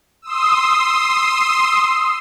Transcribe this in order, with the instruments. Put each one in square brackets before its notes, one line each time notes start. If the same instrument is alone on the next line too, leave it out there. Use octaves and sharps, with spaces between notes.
[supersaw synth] C6 D#6 E6